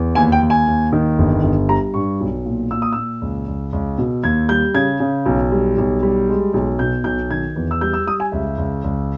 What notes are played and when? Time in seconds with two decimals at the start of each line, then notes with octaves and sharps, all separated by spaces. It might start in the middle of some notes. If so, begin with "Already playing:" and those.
Already playing: E2
0.15 D#2 G#5
0.32 G5
0.41 D#2
0.50 G#5
0.67 D#2
0.92 D#3
1.18 G1
1.43 G1
1.69 G3 A#5
1.94 G2 C#6
2.20 B1
2.45 A#2
2.71 A#2 E6
2.82 D#6
2.92 A#2 E6
3.22 C#2
3.48 C#2
3.73 C#2
3.98 B2
4.23 D#2 G#6
4.49 G3 G6
4.75 C#3 G#6
5.00 C#3
5.26 B1
5.52 G3
5.78 B1
6.03 G3
6.29 G#3
6.54 B1
6.79 B2 G6
7.04 B1 G6
7.31 D#3 G#6
7.56 E2
7.71 E6
7.81 G3 G6
7.94 E6
8.06 G3 D#6
8.20 G#5
8.32 C#2 E5
8.58 C#2
8.84 C#2